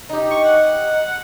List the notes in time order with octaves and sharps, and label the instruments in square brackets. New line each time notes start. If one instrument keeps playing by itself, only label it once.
[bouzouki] D#4 G4
[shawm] C#6
F#5